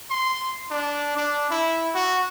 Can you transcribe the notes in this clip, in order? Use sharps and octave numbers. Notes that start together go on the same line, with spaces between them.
C6
D4
D4
E4
F#4